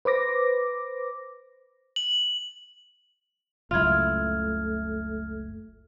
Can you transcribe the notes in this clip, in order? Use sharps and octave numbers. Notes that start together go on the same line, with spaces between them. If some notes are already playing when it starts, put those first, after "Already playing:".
B4 C5 D6 A#6
F#7
F#1 C#2 A3 E4 F4 F6 G#6